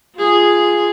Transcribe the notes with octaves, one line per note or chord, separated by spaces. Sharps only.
F4 G#4